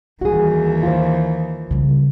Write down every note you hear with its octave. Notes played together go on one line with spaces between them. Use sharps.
D#2 E3 G3 F#4 G#4
F4 C5
C#3 G3